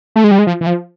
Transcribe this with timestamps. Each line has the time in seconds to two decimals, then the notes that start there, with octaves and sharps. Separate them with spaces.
0.16 A3
0.24 G#3
0.31 G3
0.39 G#3
0.47 F3
0.61 E3
0.67 F3